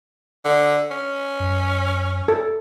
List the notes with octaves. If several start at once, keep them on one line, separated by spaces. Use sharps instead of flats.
D3
C#4
F#2
A4